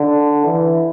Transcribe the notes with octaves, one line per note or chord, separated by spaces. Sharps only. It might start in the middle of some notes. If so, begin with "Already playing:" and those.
Already playing: D3
E3